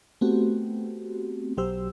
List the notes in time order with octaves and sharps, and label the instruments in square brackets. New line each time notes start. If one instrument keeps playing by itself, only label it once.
[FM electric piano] A3 B3 C4 F#4 G4
B1 F#3 G4 C5 E6